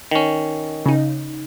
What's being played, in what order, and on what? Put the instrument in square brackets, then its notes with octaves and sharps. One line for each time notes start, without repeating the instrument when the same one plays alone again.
[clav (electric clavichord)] D#3 C#4
[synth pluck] C#3 D#4